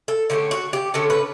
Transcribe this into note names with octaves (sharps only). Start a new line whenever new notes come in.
A4
D3 A3 C#4 G4
F#4
G4
D3 A3 C#4 A4
B4